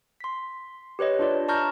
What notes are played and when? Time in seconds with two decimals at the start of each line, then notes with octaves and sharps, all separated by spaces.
0.20 C6 B6
0.99 G4 B4 C#5 D#5
1.19 D4 F4 D5
1.48 A5 A#5 C#6 F6 G6 A#6